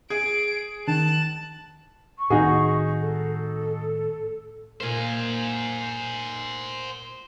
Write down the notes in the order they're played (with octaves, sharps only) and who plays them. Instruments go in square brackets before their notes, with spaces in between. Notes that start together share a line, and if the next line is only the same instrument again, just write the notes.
[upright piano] G#4 [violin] D7
[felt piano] D#3 [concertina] A5 [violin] F#6
[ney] C#6
[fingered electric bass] A2 D#3 [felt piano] D#4 F#4 G#4
[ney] A4
[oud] A#2 A#3 [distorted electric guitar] C5 G#5